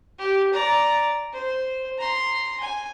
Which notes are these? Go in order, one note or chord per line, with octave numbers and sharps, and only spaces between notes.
G4
D5 A#5
C5
A#5 C6
G#5